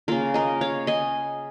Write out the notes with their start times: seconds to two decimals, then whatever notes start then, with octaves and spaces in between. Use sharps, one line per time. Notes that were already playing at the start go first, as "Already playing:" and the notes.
0.08 C#3 A#3 F4 A#4
0.34 A#4 D#5
0.61 C#5 F5
0.87 D#5 G#5